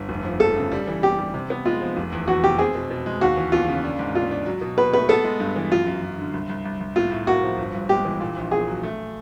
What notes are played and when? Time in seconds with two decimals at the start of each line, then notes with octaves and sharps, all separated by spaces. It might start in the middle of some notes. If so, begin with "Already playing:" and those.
Already playing: G1
0.09 F1
0.25 F3
0.40 F1 A4
0.56 C#3
0.71 G3
0.88 E3
1.03 E3 G4
1.18 G3
1.34 C3
1.50 B3
1.65 G#3 F4
1.81 F3
1.97 F1
2.12 E2
2.27 E2 F#4
2.43 F1 G4
2.59 C4 G#4
2.75 B2
2.90 B2
3.06 G#3
3.21 D#2 F#4
3.37 E3
3.52 D#2 F4
3.68 C#3
3.84 D4
3.99 G#2
4.15 D4 F4
4.31 D4
4.46 F#3
4.61 B2
4.78 B2 B4
4.93 A3 B4
5.09 B3 A4
5.24 G#3
5.40 G2
5.56 E3
5.71 F#2 F4
5.87 F#2
6.02 F#2
6.18 D3
6.33 C2
6.49 C2
6.65 C2
6.80 C2
6.96 A2 F4
7.12 A2
7.27 A#3 F#4
7.43 F3
7.58 G1
7.74 G2
7.89 G#3 G4
8.05 E3
8.20 A#2
8.37 A#1
8.51 A#2 G#4
8.68 F#3
8.83 A3